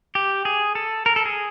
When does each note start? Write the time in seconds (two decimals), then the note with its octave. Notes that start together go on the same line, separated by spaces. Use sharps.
0.15 G4
0.45 G#4
0.75 A4
1.06 A#4
1.16 A4
1.26 G#4